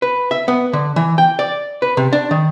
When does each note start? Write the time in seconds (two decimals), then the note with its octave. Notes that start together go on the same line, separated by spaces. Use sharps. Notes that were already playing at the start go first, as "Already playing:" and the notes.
0.02 B4
0.31 E5
0.48 B3
0.73 D3
0.96 E3
1.18 G5
1.39 D5
1.82 B4
1.97 C3
2.13 D4
2.31 D#3